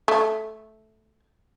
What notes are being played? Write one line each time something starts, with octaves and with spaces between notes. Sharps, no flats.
A3